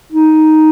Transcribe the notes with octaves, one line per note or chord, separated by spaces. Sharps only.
D#4